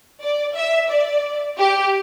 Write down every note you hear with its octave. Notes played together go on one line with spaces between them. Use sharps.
D5
E5
D5
G4